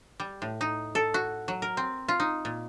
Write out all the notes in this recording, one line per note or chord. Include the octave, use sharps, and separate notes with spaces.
G3
A2
D#4
A4
F#4
F#3
A#4
C4
F4
D#4
A#2